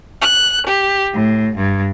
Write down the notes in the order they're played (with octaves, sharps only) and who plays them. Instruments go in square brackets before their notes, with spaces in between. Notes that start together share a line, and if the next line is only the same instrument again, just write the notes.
[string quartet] F#6
G4
A2
G2